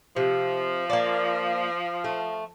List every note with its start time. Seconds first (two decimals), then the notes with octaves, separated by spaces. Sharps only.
0.16 C3 F3
0.90 A#3 D5
2.04 A3